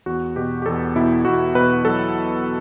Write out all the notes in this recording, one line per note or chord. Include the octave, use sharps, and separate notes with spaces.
E2 F#4
B2 G4
G4
E2 A4
B2 E4
E2 F#4
B2 B4
F#3 A4